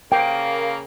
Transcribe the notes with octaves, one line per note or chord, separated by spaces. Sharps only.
C#3 A#3 G5